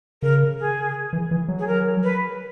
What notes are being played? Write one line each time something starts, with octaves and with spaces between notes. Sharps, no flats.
C#3 A#4
G#4
E3
E3
F#3
G#4
A#4
B4